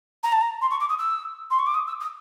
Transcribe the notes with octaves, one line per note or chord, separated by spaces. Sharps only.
A#5
A5
A#5
C6
C#6
D6
D#6
E6
C6
C#6
D6
D#6
E6
D#6